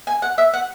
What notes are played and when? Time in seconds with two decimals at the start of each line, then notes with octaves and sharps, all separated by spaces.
0.07 G#5
0.22 F#5
0.38 E5
0.54 F#5